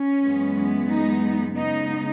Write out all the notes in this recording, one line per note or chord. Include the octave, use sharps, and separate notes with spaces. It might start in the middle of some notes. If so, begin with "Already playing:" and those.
Already playing: C#4
F#2 E3 G#3 B3
D#4
C#3 G#3 B3 D#4